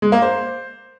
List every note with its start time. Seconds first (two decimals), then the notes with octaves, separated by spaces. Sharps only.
0.02 G#3
0.12 A#3
0.22 C5